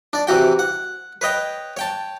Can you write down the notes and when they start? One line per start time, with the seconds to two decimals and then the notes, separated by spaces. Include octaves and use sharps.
0.13 D4 D5
0.27 C3 E3 F#4 G5
0.59 F#5
1.21 B4 C#5 D#5 G5
1.77 C#5 G5 A5